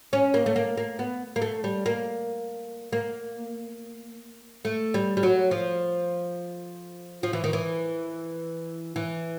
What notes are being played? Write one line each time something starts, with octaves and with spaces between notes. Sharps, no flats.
C#4
A#3
A3
A#3
A#3
B3
A#3
A3
G3
A#3
A#3
A3
G3
G3
F#3
F3
F3
E3
D#3
E3
E3